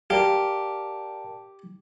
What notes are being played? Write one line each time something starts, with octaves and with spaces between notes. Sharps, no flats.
G4 A#4 D5 F5 G5 A5